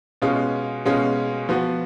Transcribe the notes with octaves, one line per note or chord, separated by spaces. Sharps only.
B2 G#3 C#4 F4
B2 G#3 C#4 F4
F3 B3 F#4